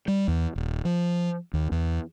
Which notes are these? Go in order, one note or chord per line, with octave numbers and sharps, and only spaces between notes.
G3
E2
D#1
F3
D#2
E2